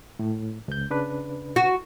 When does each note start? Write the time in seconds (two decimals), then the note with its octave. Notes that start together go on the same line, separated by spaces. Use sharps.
0.19 A2
0.68 C#2 G6
0.90 C#3 D4 B4
1.56 F#4